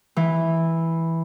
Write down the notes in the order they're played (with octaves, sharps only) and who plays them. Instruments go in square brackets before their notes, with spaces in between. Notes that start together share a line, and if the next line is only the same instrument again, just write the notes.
[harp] E3